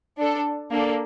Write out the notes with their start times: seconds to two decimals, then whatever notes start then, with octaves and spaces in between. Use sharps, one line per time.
0.19 D4 A4
0.72 A#3 D4 A4